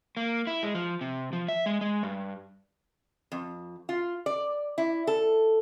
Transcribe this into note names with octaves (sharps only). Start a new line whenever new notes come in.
A#3
E4
G#3
F3
C3
F3
E5
G#3
G#3
G2
F2
F4
D5
E4
A4